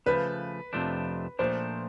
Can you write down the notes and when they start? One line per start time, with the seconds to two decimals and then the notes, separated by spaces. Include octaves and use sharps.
0.06 C#3 F3 A3 B4
0.73 F2 C3 F3 A3 D4
1.39 A#2 F3 A3 D4 C5